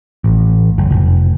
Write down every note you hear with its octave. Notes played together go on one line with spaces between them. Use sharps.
A1
F#1
F1